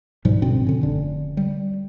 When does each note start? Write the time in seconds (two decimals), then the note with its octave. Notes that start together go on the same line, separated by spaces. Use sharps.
0.25 G#2 B2 F3 G3
0.42 G2 B2 D3 C4
0.67 D3 C#4
0.81 F1 D3
1.37 G3